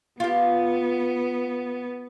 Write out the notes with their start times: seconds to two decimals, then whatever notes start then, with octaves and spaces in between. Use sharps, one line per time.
0.20 B3 F4 G4